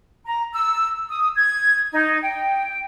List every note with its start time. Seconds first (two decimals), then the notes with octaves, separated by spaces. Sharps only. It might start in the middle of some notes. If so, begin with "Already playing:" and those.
0.25 A#5
0.53 E6
1.10 D#6
1.36 G#6
1.92 D#4
2.22 G5